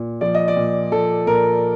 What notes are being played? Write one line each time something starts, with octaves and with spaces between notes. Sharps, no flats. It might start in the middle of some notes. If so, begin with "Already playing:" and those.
Already playing: A#2
F3 D5
D#5
D5
A#2
F3 A4
A#2 A#4